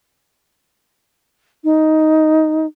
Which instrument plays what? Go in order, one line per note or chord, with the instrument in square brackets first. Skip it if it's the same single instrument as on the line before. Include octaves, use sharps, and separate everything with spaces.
[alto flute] D#4